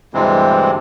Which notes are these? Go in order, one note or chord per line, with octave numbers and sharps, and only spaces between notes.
D2 G2 C3 E3 G#3 C4